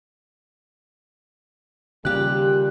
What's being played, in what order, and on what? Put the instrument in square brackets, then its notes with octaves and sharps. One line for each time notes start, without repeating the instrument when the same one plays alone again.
[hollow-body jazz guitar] D#2 G4 [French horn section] A#2 G3 [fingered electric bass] C#3 [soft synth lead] F#6